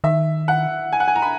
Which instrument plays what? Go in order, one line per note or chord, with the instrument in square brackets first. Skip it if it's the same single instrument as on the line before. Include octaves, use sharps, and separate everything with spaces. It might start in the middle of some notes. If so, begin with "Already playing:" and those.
[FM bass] D#3 [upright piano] E5
[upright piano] F#5
G#5
F#5
G#5
A#5
B5